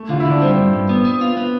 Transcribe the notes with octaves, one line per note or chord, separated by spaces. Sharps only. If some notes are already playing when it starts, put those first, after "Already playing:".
Already playing: A3
D3 F4
D3 E4
D4
G3 C4
G2
G2
B3
B3
F4
B3